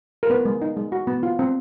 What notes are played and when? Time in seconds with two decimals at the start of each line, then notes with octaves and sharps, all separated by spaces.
0.23 A#4
0.30 B3 B4
0.45 G#3
0.62 D#4
0.77 G#3
0.92 F#4
1.07 B3
1.23 F4
1.39 C4